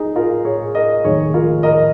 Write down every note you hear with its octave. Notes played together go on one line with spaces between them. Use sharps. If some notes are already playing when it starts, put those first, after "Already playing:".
Already playing: D#4 G#4
F4 A#4
G#4 C#5
A#4 D#5
F1 D#2 D#3 G#4 C#5
F4 A#4
A#4 D#5